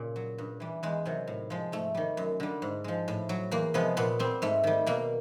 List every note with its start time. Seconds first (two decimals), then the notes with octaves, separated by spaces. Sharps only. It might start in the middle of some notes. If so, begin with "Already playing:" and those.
Already playing: A#2 C#3
0.16 F#3
0.38 G2
0.60 E3 G3
0.83 E2 G#3
1.05 C3 D#3 F#3
1.27 A2
1.50 F3 G#3
1.72 G#2 A3
1.95 D#3 G3
2.17 F#2
2.40 D3 G3
2.62 G#2
2.84 F3 G#3
3.08 A2
3.29 F#3
3.51 E2 A#3
3.74 C3 F3 G#3 B3
3.97 A#2 B3
4.19 G3 C4
4.42 G#2 A3
4.64 D#3 G3
4.86 B2 A#3